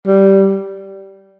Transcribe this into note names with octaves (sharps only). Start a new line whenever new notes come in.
G3